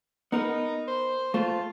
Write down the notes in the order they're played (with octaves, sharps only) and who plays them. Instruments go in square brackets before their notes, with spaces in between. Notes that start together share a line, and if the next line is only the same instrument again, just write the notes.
[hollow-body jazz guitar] B3 A#4 B4 [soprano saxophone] D#4
[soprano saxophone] C5
[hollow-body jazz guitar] A3 C5 [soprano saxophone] F4